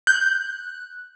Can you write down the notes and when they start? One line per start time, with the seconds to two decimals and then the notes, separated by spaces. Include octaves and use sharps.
0.07 F#6 G6